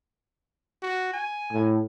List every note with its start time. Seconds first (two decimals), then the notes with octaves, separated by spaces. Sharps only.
0.83 F#4
1.14 G#5
1.52 A2